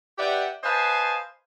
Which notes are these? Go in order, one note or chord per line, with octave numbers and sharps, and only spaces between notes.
G4 B4 D5 E5 F#5 G5
B4 C5 D#5 F5 G#5 A5